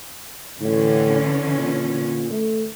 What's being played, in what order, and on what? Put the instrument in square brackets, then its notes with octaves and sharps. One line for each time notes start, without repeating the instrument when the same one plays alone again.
[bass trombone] A2 [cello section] D3 E3 C#4
[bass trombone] A#2
A3